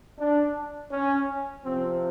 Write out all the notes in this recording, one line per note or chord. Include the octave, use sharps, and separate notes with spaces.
D4
C#4
C3 F3 C4